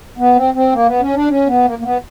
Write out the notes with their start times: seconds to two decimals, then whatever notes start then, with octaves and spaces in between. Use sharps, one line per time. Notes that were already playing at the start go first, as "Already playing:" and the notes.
0.18 B3
0.36 C4
0.54 C4
0.73 A#3
0.86 B3
1.01 C#4
1.14 D4
1.28 C#4
1.47 B3
1.65 A#3
1.79 A#3
1.84 B3